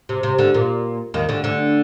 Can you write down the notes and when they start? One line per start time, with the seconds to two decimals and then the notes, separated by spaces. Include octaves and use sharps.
0.09 C3
0.23 C3
0.39 D2 D3
0.54 A#2
1.14 D#2 D#3
1.29 D2 D3
1.44 D2 D3